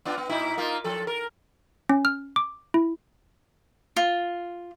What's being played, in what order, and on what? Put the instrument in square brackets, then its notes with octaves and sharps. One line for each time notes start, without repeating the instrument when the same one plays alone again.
[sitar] B3 D4 F4
B3
A#2 D#4 E4
A#3 D#4 F4
F3 A4
A#4
[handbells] C#4
F6
D6
E4
[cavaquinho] F4